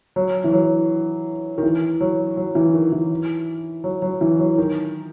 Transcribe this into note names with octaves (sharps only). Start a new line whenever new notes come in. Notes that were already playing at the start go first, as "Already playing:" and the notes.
F#3
E3
F#3
D#3
E3
F#3
F#3
E3
D#3
E3
F#3
F#3
E3
F#3
D#3